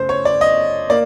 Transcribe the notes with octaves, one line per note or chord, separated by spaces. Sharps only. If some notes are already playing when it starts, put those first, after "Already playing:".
Already playing: F#2 C#3 A3 C5
C#5
D5
D#5
A#3 D5